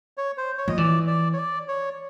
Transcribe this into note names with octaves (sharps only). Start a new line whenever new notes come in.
C#5
C5
C#5
F3 D#5
E3 D5
D5
C#5
D5
C#5